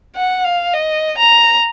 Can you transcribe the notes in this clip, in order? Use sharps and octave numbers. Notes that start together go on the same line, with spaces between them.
F#5
F5
D#5
A#5